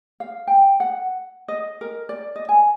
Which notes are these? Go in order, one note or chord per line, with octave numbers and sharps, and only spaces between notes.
F5
G5
F#5
D#5
A#4
D5
D#5
G#5